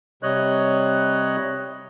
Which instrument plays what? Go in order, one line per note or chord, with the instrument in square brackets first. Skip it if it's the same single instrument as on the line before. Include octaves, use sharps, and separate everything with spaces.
[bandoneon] C3 G3 C#5 D#5 F#6